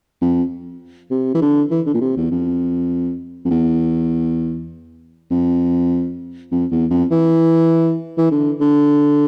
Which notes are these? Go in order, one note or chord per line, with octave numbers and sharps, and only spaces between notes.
F2
C3
E3
D3
E3
D3
A#2
C3
E2
F2
F2
E2
F2
F2
E2
F2
E3
E3
D3
D3